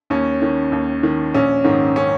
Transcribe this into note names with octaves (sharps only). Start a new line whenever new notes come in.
D#2 C#4
D#3
D#2
D#3
A#1 C#4
G#2 D#3
C#4